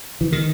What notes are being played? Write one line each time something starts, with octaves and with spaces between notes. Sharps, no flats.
E3
D#3